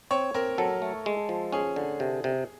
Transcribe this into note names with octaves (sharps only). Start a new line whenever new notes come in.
C4 C#5
C4 A#4
F#3 A4
A3
G#3
F3
C#4 G#4
D3
C3
C3